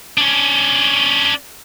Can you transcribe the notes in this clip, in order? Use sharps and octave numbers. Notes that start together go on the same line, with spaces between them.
C#4 D4